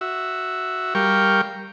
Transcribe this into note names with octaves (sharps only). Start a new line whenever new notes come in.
F#4 E5
G3 A#4 F5 G5 C#6